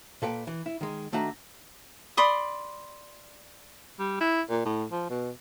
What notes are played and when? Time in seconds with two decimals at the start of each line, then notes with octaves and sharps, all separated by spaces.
0.22 A#2 A4 B4 G5
0.47 E3
0.66 E4
0.81 D#3 G#3
1.12 D#3 A3 D4 F#4 A#5
2.17 D5 B5 C6 D#6
3.99 G3
4.21 E4
4.50 A#2
4.65 A2
4.92 F3
5.10 B2